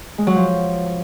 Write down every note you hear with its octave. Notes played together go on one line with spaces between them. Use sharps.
G#3
F#3
F3